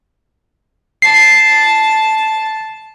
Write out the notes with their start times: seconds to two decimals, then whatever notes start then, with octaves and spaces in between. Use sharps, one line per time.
1.02 A5 C7